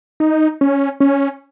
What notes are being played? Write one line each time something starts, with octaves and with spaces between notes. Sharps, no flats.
D#4
C#4
C#4